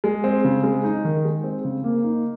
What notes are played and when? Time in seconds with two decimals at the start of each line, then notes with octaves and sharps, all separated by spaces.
0.04 G#3
0.24 C4
0.45 C#3
0.63 G#3
0.84 D#4
1.05 D#3
1.25 G#3
1.44 C4
1.65 C#3
1.84 A#3
2.04 D#4